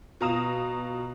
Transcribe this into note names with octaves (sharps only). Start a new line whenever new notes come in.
B2 F4 A#5 D#6 E7